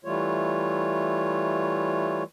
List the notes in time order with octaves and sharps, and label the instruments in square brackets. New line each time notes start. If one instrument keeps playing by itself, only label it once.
[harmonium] E3 G3 A3 F4 C#5